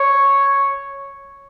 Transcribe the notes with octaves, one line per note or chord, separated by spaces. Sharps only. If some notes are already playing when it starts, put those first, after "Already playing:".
Already playing: C#5